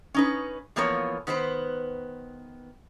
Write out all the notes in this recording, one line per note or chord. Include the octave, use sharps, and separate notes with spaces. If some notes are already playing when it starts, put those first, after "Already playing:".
C#4 D#4 B4
E3 F3 A#3 B3 A#4 C#5
D#3 B3 B4 C5